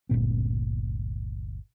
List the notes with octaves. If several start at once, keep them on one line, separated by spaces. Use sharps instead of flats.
G1 D2 A#2 C4